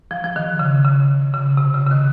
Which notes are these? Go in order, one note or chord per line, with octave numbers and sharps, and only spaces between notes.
F3
F3
D#3
C#3
C#3
C#3
C3
C#3
C#3
D#3